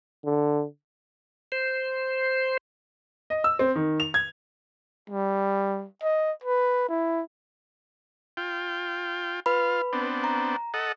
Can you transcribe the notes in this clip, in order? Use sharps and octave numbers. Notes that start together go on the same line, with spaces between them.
D3
C5
D#5
E6
C4
D#3
F7
G#6
G3
D#5
B4
E4
F4 G5
F4 B4 F5 B5
B3 C4 D4
A#5
A4 D#5 F#5